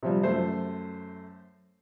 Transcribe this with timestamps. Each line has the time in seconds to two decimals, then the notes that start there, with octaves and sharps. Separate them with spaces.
0.03 C3 F3 G3
0.23 F#2 A3 C5